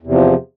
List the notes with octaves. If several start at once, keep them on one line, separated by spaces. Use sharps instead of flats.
E2 C3 F3